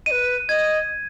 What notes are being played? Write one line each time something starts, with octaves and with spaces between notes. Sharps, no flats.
B4 D#5 D#7
D#5 G#6